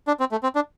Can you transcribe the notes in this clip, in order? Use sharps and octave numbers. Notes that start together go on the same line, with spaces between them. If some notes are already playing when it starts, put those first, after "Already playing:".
D4
C4
A3
C4
D4